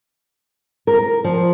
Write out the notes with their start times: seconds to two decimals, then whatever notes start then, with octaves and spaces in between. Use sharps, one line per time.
0.87 A#4
1.24 F3